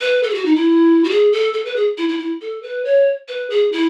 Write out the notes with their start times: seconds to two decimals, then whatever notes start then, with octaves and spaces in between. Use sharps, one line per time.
0.01 B4
0.23 A4
0.30 G#4
0.34 F#4
0.45 D#4
0.56 E4
1.04 F#4
1.10 G#4
1.33 A4
1.54 A4
1.65 B4
1.76 G#4
1.98 E4
2.09 E4
2.19 E4
2.41 A4
2.63 B4
2.85 C#5
3.28 B4
3.50 G#4
3.72 E4